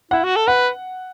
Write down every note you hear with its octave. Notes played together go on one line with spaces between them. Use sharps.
E4 F#5
F#4
A4
B4 F#5